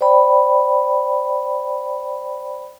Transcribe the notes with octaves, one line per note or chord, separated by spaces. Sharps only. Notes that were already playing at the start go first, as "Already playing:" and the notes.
C5 D5 G5 B5